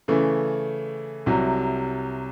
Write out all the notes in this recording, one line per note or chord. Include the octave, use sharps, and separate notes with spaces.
C#3 E3 A3
C2 C3 F#3